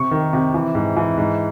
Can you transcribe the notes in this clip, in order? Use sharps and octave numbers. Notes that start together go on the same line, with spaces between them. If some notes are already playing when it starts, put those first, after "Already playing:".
Already playing: C3 C#6
D#3
C3
E3
G#2
E3
G#2